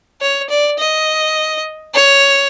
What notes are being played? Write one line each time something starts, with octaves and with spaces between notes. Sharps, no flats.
C#5
D5
D#5
C#5